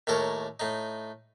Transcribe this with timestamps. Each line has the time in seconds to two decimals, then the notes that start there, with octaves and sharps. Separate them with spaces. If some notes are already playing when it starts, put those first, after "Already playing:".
0.07 D#2 A2 A4 A#4 C#5
0.60 A2 D#4